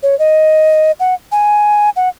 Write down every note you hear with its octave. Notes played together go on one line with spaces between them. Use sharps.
C#5
D#5
F#5
G#5
F#5